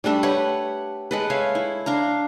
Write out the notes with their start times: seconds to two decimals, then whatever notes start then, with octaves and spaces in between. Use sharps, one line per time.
0.04 G3 A3 D4 A4
0.23 G4 B4 C#5 F#5
1.11 G#3 A4 B4
1.30 C#5 E5 F5
1.55 E4
1.86 D4 F5 A#5